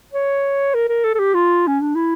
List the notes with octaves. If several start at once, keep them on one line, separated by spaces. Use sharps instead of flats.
C#5
A#4
A#4
A4
A4
G4
F4
C#4
D4
E4